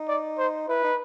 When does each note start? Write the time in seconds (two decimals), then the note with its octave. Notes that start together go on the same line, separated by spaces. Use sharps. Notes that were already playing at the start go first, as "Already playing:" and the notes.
Already playing: D#4
0.08 D5
0.38 C5
0.69 E4 B4
0.84 D#4